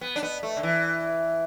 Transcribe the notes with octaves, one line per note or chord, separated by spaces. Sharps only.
B3
D4
B3
A3
D3
E3